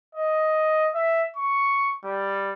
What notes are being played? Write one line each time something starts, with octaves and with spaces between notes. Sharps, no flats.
D#5
E5
C#6
G3